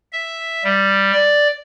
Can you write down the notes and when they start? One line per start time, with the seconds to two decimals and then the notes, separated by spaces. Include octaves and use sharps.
0.12 E5
0.64 G3
1.12 D5